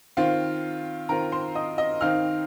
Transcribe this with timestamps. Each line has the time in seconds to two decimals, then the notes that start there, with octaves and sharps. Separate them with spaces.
0.17 D#3 C4 F4 F5
1.09 D#3 C4 F4 A#4 A#5
1.32 C5 C6
1.55 D#5 D#6
1.78 D#5 D#6
2.01 D#3 C4 D#4 F5 F6